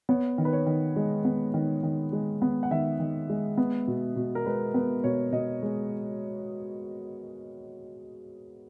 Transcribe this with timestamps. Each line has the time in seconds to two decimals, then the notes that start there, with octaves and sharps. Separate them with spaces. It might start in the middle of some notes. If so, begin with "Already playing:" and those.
0.09 B3 C#5
0.38 D#3
0.45 B4
0.53 C#5
0.66 D#3
0.96 G#3
1.25 B3
1.54 D#3
1.83 D#3
2.13 G#3
2.42 B3
2.63 F#5
2.71 D#3 E5
3.00 D#3
3.29 G#3
3.58 B3
3.87 B2
4.16 B2
4.35 A#4
4.46 G#3 B4
4.74 B3 B4
5.04 B2 C#5
5.32 B2 D#5
5.63 G#3